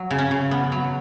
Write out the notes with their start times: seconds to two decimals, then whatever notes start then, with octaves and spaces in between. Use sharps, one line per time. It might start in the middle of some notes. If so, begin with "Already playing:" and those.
Already playing: F#3
0.11 C#3
0.19 C#4
0.31 C#3
0.51 B3
0.72 F#3